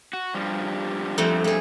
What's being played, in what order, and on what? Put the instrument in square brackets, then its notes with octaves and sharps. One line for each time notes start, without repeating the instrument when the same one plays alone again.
[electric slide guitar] F#4
G2 F3 G3
[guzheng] F2 A3 C4
A3 G#4